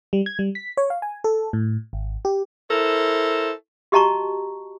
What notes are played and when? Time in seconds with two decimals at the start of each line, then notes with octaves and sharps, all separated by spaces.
0.13 G3
0.26 G#6
0.39 G3
0.55 B6
0.77 C#5
0.90 F5
1.02 G#5
1.24 A4
1.53 A2
1.93 G#1
2.25 G4
2.70 E4 A4 A#4 C5
3.92 F#4 G4 D#5 A5 A#5 C#6